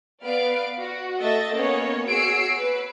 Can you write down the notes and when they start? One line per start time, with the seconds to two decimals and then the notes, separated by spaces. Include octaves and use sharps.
0.24 B3 B4 D5 F5 D7
0.79 F#4
1.21 A3 D#5 E5 A6
1.55 A#3 B3 C#4 C#5 D#5
2.06 F#4 G#4 C#5 E6 C7 D7
2.58 B4